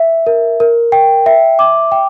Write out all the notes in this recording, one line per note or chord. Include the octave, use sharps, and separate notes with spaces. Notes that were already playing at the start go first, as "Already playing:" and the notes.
Already playing: E5
A#4
A#4
G5
E5
D6
G5